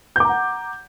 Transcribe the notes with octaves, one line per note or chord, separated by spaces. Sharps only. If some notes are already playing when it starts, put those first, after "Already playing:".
F#5 A#5 D6 G6